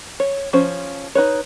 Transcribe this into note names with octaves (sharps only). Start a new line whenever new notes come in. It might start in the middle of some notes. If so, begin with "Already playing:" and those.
C#5
F3 C#4 C5
D#4 B4 C#5